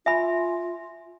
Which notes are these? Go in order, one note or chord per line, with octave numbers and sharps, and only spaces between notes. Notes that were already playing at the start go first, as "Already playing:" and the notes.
F4 E5 G#5 B5